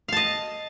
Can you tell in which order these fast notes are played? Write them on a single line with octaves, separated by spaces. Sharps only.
F5 A5 D#5